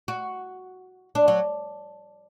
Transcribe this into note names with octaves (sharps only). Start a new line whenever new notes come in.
F#4
D4
F#3